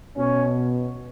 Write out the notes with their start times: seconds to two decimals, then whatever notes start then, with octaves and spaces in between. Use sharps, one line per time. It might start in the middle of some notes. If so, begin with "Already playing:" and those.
0.17 B2 C#4